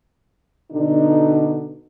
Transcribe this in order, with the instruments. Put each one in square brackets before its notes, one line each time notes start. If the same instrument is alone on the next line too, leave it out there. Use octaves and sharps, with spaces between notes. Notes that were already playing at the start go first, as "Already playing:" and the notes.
[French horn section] B2 D3 D4 D#4